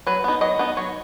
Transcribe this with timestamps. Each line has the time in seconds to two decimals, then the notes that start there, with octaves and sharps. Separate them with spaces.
0.07 F#3 B4
0.24 B3 D#4
0.41 F#3 D#5
0.59 B3 D#4
0.77 F#3 C#5